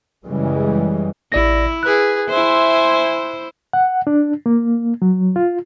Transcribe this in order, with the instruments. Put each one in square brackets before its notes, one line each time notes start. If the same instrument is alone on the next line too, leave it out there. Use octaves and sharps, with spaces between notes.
[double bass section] F#2 C#3 E3 G3 G#3
[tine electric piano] A1 D5 A#6 [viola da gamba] E4
[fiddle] G#4 B4 [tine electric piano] F#6
[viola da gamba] E4 C5 [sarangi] E5 [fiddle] G#5 C6
[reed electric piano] F#5
D4
A#3
F#3
F4